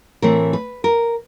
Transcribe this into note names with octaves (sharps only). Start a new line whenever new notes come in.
A2 E3 A3 C4 A#4
B4
A#4